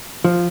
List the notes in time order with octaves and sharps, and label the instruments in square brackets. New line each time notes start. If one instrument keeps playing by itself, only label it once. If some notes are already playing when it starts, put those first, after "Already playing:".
[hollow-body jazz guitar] F3